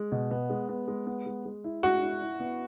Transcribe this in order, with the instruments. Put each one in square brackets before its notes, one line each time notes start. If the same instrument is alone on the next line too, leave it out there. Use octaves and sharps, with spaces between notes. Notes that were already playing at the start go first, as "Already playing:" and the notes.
Already playing: [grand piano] G#3
B2
B3
G#3
B3
G#3
B3
G#3
G#3
E4
[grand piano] G#3 [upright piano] F#4
[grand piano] E4
E4
B3